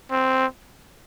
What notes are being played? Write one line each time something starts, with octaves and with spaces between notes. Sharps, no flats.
C4